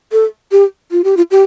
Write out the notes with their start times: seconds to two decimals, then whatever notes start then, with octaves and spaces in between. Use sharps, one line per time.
0.12 A4
0.52 G4
0.91 F4
1.04 G4
1.17 F4
1.31 G4